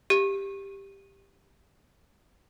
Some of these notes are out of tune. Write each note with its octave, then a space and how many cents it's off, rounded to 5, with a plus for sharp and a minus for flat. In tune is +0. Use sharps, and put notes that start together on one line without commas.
G4 +5